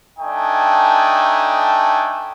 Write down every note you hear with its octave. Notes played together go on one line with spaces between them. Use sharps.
A3 D4 D#4 G5 G#5